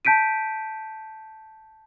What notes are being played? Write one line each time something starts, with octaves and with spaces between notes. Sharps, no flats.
A5 G6 B6 D7 D#7